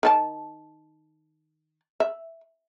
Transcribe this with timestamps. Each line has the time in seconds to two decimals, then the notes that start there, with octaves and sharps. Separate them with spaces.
0.03 D#3 D4 A5
2.00 E5